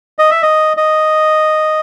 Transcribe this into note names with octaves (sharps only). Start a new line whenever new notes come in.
D#5
E5
D#5
D#5